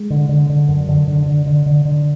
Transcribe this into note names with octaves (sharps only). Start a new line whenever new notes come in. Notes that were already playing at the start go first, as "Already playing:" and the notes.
Already playing: G#3
D3
D3
D3
F#2
D3
D3
D3
D3
D3
D3